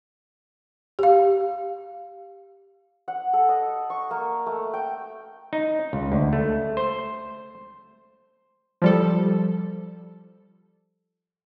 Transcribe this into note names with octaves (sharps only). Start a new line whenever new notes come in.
G4 F5
F#5
A4
D#5
C#6
A#3
A3
G5
D#4
C#2
D2
A3
C5
F3 G3 A4